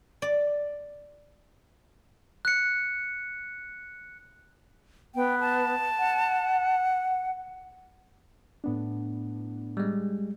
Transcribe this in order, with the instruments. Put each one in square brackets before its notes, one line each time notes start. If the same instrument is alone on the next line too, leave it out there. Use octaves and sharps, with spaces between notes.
[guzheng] D5
[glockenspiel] F#6 C#7
[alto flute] B3 [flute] G5
[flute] A5
[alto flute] F#5
[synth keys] A2 B3 D4
[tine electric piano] G3 G#3